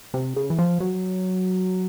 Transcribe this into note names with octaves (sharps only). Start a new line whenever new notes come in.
C3
C#3
E3
F3
F#3